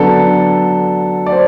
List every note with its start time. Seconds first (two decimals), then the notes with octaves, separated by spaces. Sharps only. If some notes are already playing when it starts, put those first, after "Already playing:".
Already playing: D3 F#3 B3 D4 A4
1.26 D5
1.32 C5